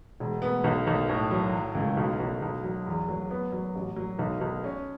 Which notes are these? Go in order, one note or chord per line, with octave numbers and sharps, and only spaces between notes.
E1
B3
B1
B1
A2
F#3
F#3
C#2
B1
B1
B1
F#3
E2
F#3
B3
F#3
A1
F#3
B1
B1
C#4